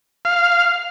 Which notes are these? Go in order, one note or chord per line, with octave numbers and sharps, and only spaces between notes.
F5